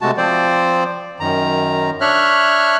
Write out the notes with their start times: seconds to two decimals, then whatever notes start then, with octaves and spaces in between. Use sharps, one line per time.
0.01 C3 G#3 A3 F#4 A5
0.17 F3 C4 C5 D5
1.20 F#2 D#3 A#5
2.01 D4 C#5 E5 F6 F#6